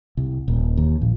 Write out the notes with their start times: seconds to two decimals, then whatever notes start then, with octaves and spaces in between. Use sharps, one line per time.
0.17 C2
0.48 D#1
0.77 D#2
1.02 A#1